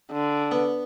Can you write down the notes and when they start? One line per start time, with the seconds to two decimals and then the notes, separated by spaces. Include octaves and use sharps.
0.12 D3
0.51 B3